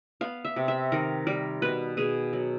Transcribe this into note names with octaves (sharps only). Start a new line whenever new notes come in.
B3 F5
E5
C3
E5
D#3 A#4
G3 A#4
B2 B4
B2 G#4
F#3